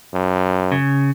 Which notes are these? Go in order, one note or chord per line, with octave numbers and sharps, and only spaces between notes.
F#2
C#3